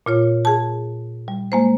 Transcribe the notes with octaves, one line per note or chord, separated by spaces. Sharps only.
A#2 F4 C#5
G#4 A5
G3
G#3 A#3 C5